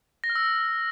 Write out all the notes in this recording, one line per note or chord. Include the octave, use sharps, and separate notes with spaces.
A#6
F6
E6